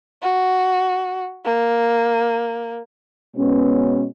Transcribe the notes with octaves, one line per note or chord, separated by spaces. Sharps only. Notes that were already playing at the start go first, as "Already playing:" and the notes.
F#4
A#3
B2 G#3 B3 C#4